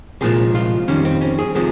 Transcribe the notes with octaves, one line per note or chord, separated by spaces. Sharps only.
C2 A#2 F3 G#3 G#4
F4
F2 D#3 G3 C#4
C4
C#4
G#4
C3 F3 G#3 G#4